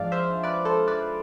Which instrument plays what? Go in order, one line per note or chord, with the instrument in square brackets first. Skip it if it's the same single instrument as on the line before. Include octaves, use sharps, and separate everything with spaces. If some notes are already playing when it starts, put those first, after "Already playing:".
Already playing: [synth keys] G#2 F3 G#3 D4 D5 F5
C5 E5
B4 D5
A4 C5
B4 D5